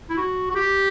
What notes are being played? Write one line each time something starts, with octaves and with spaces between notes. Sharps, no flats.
E4
F#4
F#4
G4